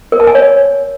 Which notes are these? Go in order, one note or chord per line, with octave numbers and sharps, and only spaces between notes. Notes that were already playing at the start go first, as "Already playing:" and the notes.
A#4
A5
G#5
C#5